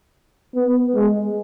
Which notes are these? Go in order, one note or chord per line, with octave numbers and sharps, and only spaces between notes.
B3
G#3